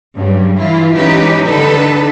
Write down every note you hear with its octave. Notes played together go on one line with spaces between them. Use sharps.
G2 C#3 F#3 G3
E3 E4 F4
E3 G#3 C#4 D#4 G4 B4
D3 D#3 D4 D#4 A4 B4